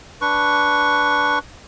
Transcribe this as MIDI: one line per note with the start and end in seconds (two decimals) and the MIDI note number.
0.21 1.39 62
0.21 1.39 71
0.21 1.39 85